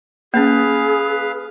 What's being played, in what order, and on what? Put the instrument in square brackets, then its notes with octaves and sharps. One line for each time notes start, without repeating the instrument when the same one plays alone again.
[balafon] A#3 C#4 [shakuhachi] G#4 [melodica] B4 F5